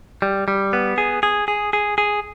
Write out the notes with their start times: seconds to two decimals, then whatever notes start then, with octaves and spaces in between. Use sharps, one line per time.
0.22 G3
0.48 G3
0.73 B3
0.98 G#4
1.23 G#4
1.48 G#4
1.73 G#4
1.98 G#4